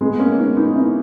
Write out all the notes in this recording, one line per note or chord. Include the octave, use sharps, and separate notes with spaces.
G#3 B3
A#3 C#4
B3 D#4
B3 D#4
C#4 E4